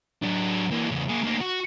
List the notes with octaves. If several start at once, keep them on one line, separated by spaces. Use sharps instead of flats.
F#3 D4
E3 A#3
E2 C#3
A#3 G#4
D2 A#3
F#4